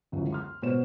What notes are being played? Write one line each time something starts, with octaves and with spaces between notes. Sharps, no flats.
G1 C#2 F#2 E3 F#3
C6 F6
B2 B3 C5 C#5 E7